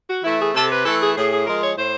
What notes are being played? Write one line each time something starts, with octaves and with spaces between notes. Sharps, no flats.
F#4
E3 A3 E4
G#4
C3 A4
B4
E3 A3 A4
G#4
A2 G#4
G#4
F3 G#3 A#4
C#5
A2 C5